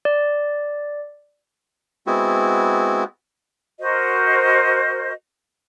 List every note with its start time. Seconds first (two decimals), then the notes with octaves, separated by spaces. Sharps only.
0.05 D5
2.07 G#3 B3 C4 E4 F#4
3.79 F#4 A#4 C5 D#5